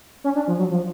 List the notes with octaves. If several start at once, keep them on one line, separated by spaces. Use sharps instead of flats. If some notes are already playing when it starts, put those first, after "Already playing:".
C#4
D4
F3
F#3
F3